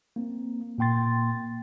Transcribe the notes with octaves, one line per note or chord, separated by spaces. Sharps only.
A#3 C4
A#2 A#3 G5 C6 A6